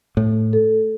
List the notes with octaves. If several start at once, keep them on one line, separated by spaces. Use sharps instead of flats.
A2 A3
A4